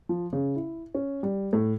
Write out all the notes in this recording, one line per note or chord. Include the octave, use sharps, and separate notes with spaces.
F3
C#3
E4
C#4
G3
A2